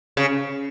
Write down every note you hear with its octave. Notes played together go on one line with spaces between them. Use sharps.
C#3